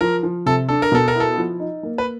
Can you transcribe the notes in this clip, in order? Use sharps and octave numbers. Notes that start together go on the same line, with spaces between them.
F3 A#4
F3
C3 A4
D4 A4
A#4
B2 A4
A#4
E4 A4
F3
D#4
A#3
B4